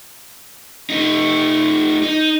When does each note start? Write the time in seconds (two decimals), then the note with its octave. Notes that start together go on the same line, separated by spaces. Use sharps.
0.90 A3 D#4
2.03 D#4